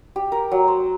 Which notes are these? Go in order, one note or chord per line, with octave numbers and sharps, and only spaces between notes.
G4
A#4
F#3
C5